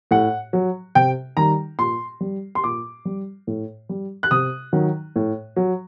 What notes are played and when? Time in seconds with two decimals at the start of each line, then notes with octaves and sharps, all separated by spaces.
0.11 A2 F#5
0.53 F#3
0.95 C3 G5
1.37 D#3 G3 A#5
1.79 A#2 C6
2.21 G3
2.55 C6
2.64 A#2 D6
3.05 G3
3.47 A2
3.89 G3
4.23 F#6
4.31 C3 D#6
4.73 D#3 F#3
5.16 A2
5.56 F#3